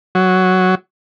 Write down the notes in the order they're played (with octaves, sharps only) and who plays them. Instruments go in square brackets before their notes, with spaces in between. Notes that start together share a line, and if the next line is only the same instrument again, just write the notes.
[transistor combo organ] F#3